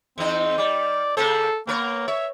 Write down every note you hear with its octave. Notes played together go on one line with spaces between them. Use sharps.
E2 C4 D#4
G3 D5
C#3 A#3 A4 C5
A#3 B3 A#4 C#5
C#5 E5